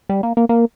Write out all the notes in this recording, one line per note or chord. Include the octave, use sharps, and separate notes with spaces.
G3
A#3
A#3
A#3